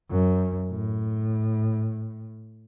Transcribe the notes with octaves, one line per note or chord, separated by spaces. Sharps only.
F#2
A2